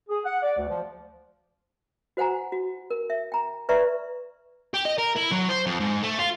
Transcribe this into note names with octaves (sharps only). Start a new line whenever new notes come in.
G#4
F#5
D5
D2
F3
F#4 C5 F#5 G#5 A#5
F#4
A#4
E5
G5 A#5
B4 D5 E5 A#5 C6 C#6
G4
D#5
A#4
E4
F#3
C5
F2
G#2
A3
F4